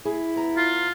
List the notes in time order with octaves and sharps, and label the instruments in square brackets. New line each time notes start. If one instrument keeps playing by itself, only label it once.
[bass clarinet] E4 [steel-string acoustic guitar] G#4
[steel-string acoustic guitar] B3 A#5
[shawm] F4